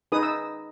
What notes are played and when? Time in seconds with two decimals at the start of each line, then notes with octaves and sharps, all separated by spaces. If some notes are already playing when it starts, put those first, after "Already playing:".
0.12 D#4 G#4 B4 D#6
0.23 E6